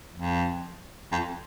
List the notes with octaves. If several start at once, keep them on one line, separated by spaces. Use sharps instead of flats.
F2
F2